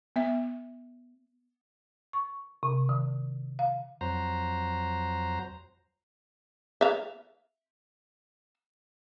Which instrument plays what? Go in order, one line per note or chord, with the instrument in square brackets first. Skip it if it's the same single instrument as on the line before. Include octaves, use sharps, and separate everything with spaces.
[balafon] B3 E5
[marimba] C#6
C3
D#3
F5
[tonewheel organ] F2 F#3 C5 A#5
[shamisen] E5 F5